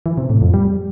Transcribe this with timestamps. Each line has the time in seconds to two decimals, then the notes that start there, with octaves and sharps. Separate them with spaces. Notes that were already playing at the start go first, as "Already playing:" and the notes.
0.06 E3
0.18 C3
0.30 A2
0.42 F2
0.54 G3